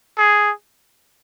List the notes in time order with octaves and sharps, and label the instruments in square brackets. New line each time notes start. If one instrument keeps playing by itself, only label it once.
[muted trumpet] G#4